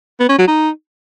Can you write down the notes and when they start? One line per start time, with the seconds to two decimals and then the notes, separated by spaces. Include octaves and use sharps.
0.20 B3
0.29 C#4
0.39 F#3
0.48 D#4